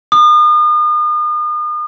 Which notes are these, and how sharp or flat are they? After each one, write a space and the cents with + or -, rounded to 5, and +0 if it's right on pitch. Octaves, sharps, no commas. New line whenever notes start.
D#6 -40